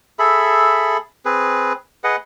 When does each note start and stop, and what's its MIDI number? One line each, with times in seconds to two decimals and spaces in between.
0.19 0.97 68
0.19 0.97 69
0.19 0.97 76
0.19 0.97 83
1.25 1.73 60
1.25 1.73 68
1.25 1.73 71
2.04 2.16 68
2.04 2.16 71
2.04 2.16 75
2.04 2.16 78